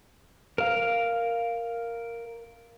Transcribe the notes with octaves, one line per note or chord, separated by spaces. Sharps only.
A#4 F5